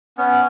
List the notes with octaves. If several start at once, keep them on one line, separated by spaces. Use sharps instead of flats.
B3 C#4